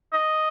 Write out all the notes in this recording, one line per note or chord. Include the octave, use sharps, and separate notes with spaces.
D#5